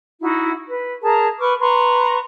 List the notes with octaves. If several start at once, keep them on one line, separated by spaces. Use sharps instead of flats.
D#4 E4 F#4
B4
G#4 A#4 A5 A#5
B4 C#6 D6 F6
B4 A#5 C6 C#6